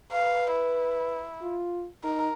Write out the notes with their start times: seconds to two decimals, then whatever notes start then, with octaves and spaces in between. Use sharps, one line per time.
0.12 B4 F5
0.52 E4
1.42 F4
2.04 D#4 A#4